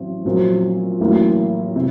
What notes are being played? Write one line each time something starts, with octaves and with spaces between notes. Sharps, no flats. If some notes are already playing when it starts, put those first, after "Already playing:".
Already playing: A1 F#3 C4
A#1 A#2 F#3 C4
A1 A2 F#3 A#3
C3